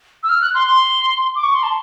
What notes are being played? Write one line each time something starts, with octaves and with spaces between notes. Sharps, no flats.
E6
F6
F#6
C6
C6
D6
C#6
C6
A5